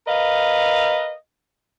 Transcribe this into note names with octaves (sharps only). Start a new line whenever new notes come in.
A#4 B4 D#5 F5